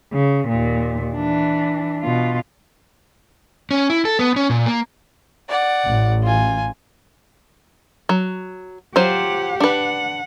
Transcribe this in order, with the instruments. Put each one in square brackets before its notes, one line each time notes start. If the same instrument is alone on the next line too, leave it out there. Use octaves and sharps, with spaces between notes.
[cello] C#3
D#2 A#2
E3 D4
B2 F4
[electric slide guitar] C#4
E4
A4
B3
C#4
A#2
A#3
[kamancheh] D5 F#5
[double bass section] A1
[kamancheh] F4 G#5
[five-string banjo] F#3
[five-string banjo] F#3 F4 C5 [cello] G4 F#5
[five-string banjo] D4 B4 [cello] F#5